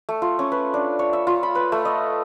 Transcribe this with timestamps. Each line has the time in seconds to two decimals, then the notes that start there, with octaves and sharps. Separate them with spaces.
0.09 A3
0.22 F4
0.39 C#4
0.52 B4
0.74 D4
0.99 C#5
1.13 E5
1.27 F4
1.43 B5
1.55 B4
1.72 A3
1.85 D#5